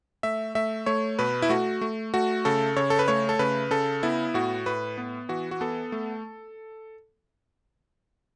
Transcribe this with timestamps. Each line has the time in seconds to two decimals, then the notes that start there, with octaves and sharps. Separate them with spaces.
0.23 A3 E5
0.55 A3 E5
0.86 A3 C#5
1.19 B2 B4
1.42 E4
1.49 A3 F#4
1.81 A3
2.14 A3 F#4
2.45 C#3 A4
2.76 C#3 C#5
2.90 A4
2.99 B4
3.08 A3 C#5
3.29 A4
3.39 C#3 B4
3.71 C#3 A4
4.03 B3 E4
4.34 A2 F#4
4.66 A2 B4
4.98 B3
5.29 E3 F#4
5.51 F#4
5.61 B3 A4
5.92 A3